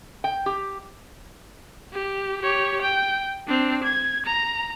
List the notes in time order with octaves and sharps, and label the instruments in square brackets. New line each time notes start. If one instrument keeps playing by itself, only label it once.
[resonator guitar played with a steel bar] G5
G4
[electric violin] G4
G4 C#5
G5
C4 D4
G#6
A#5